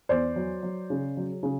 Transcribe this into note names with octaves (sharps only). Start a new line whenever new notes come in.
E2 C5 D5
F#3
F#3
C#3
F#3
C#3